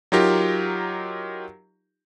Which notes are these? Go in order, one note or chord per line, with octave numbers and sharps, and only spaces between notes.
F#3 D#4 F4 G4 A#4